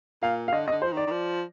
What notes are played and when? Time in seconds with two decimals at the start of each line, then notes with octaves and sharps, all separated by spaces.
0.23 A#2 F5
0.48 F5
0.53 D3 D#5
0.67 C3 D#5
0.72 D3
0.82 F3 C5
0.92 D#3 D5
1.07 D#3
1.12 F3